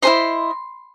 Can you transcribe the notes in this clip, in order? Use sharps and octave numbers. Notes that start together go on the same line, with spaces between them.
E4 G#4 C5 D#5 C6